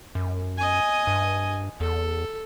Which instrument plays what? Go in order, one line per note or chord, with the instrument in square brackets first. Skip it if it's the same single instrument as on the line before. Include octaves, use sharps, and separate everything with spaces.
[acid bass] F#2
[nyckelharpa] D#5 G#5
[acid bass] G2
[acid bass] E2 [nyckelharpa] A4